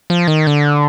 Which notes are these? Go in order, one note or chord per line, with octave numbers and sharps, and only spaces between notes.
F3
D#3
D3